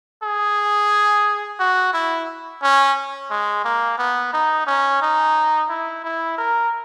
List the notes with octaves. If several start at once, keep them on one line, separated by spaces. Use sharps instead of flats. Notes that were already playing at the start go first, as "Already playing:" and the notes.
G#4
F#4
E4
C#4
G#3
A#3
B3
D#4
C#4
D#4
E4
E4
A#4